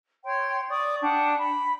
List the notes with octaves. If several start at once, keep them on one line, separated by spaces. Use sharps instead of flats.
C#5 G5 C6
D5 C#6 D#6
D4 F#5 G5
B5